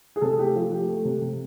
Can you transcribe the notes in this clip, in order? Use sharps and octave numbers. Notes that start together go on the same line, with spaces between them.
G#4
C3 A4
A3 G4
F3 G4
A3 G4
A3
C3
C3